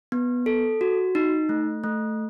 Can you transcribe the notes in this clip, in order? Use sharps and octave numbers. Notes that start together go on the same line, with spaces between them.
B3
A4
F#4
D#4
A3
A3